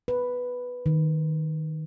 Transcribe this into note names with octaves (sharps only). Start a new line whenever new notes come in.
B4
D#3